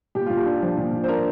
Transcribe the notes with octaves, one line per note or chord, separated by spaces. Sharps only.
A#2 G4
A#2 F4
G4
D4
F3
A#2
A#2
C5
D4 A#4